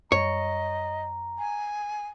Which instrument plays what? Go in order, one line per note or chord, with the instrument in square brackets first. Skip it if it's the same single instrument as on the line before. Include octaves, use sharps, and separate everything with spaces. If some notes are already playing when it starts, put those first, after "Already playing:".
[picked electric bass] F#2 G3 [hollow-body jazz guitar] C#5 [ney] D#5 [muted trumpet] A#5
[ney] G#5